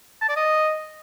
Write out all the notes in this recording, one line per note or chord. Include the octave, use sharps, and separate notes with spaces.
A5
D5
D#5